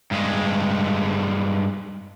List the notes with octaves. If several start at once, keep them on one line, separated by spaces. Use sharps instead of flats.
G2 G#3